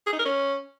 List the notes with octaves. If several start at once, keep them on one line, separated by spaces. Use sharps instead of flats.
G#4
D#4
A#4
C#4